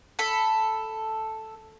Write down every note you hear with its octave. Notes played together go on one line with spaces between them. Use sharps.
A4 B5